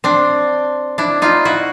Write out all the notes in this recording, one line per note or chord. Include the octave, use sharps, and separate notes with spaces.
C4 D4
D4 E4
D#4 F4
E4 F#4